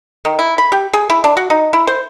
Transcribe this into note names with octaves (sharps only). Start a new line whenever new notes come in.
D#3
E4
B5
G4
G#4
E4
D4
F#4
D#4
E4
C5